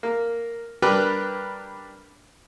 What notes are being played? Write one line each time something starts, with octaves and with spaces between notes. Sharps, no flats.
A#3
G3 D4 G4 A#4 B4 G5